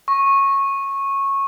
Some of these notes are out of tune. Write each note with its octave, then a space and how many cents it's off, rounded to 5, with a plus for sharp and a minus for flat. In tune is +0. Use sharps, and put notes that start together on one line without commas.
C#6 -15